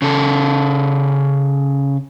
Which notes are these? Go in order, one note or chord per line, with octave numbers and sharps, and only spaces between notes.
C#3 A4